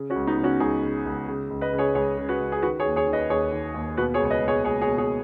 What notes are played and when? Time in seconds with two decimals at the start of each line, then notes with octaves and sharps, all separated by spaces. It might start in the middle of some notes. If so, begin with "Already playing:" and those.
Already playing: C#3
0.10 C#4 F#4
0.16 C#2
0.27 B3 D#4
0.38 C#3
0.44 C#4 F#4
0.60 C#2 D#4 G#4
0.83 C#3
1.06 C#2
1.28 C#3
1.50 C#2
1.61 B4 D#5
1.73 C#3
1.78 G#4 C#5
1.95 C#2 G#4 C#5
2.18 C#3
2.29 F#4 B4
2.40 C#2
2.52 G#4
2.62 D#3 F#4 B4
2.80 G#4 C#5
2.86 D#2
2.96 G#4 C#5
3.07 D#3
3.13 B4 D#5
3.29 D#2 G#4 C#5
3.52 D#3
3.74 D#2
3.97 B2 F#4 B4
4.14 G#4 C#5
4.20 C#2
4.25 C#5
4.31 B4 D#5
4.43 B2
4.48 G#4 C#5
4.65 C#2 G#4 C#5
4.81 G#4 C#5
4.87 B2
4.98 G#4 C#5